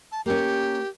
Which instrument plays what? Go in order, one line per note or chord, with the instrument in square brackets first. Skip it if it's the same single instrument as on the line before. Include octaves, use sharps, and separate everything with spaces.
[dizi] A5
[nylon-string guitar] A#3 C#4 [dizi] G4